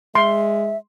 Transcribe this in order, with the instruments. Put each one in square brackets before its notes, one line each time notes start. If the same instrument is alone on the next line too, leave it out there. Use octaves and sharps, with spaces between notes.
[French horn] G#3 [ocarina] E5 [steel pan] C6